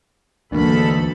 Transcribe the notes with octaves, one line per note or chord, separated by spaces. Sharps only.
D2 G#2 E3 F#3 A#3 D4 A4 B5